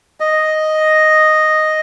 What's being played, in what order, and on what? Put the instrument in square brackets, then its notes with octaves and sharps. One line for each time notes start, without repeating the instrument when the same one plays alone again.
[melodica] D#5